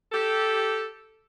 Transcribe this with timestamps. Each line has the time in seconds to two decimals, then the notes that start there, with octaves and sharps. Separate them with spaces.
0.12 G4 A4